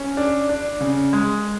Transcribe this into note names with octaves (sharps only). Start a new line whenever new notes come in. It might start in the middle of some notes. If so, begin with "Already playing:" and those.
Already playing: C#4
D4
D4
C#3
G#3